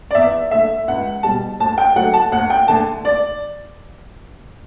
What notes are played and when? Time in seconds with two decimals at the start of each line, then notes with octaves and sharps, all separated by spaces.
0.11 D5
0.15 E2 E5
0.51 D3 A3 E5
0.88 C#2 F#5
1.23 B2 G3 A5
1.60 D2 A5
1.78 G5
1.96 D3 F#3 A3 F#5
2.13 A5
2.32 D2 F#5
2.50 G5
2.68 D3 A3 A5
3.05 D5